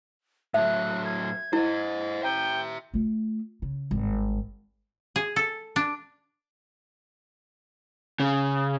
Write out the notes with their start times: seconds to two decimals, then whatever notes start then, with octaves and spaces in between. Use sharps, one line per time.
0.54 A2 F#3 E5 F#6
1.05 G#6
1.53 E4 C5 D#5
2.23 E5 G5 A#5
2.94 A3 F4
3.62 C#3
3.91 G#1 G2
5.16 G#4
5.36 A4
5.76 D4
8.20 C#3